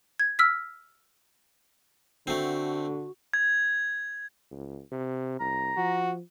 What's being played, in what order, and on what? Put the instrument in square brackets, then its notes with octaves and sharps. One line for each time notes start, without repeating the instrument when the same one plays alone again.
[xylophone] G#6
E6 F6 B6
[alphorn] D3 [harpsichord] A3 C4 [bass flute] F#4
[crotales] G#6
[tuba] C#2
C3
[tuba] C2 [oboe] A#5
[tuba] F3 [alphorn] F#4